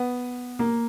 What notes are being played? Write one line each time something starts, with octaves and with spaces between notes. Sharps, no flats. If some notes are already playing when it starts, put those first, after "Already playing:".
Already playing: B3
A#3